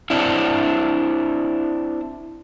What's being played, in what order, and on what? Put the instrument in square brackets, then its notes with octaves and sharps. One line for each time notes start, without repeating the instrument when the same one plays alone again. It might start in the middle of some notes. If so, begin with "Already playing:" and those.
[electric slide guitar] C4 D4 E4